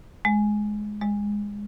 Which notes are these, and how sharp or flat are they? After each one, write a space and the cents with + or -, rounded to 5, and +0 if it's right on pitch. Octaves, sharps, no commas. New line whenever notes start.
G#3 +10
G#3 -15